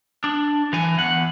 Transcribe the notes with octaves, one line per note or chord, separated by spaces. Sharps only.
D4
E3 G#5
E2 F#5